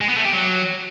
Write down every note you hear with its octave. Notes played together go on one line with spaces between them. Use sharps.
G#3
B3
A3
G4
F#3